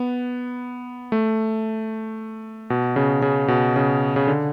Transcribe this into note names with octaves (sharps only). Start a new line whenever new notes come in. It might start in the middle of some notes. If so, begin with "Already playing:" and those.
Already playing: B3
A3
B2
C#3
C#3
B2
C#3
C#3
D3